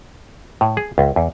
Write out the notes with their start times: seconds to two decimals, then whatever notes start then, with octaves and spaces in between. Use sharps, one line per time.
0.61 A2
0.77 G#4
0.98 C#2
1.16 E2